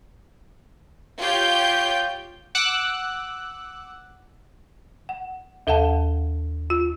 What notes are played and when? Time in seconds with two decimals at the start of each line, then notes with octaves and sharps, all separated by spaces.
1.20 F4 G4 C#5 G6
2.55 F#5 D6 E6 F#6
5.09 F#5
5.67 D#2 A4 F5 F#5 A5
6.70 F4